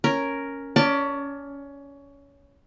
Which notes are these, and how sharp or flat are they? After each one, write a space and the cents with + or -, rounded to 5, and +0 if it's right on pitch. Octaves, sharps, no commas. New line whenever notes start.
C#4 +0 A#4 +0
C#4 +20 D5 +0 A5 +25